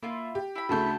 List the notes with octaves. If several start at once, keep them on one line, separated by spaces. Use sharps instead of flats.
A#3 E4 F4
G4
E4 B5
D2 C#3 A3 F#4 A5 G6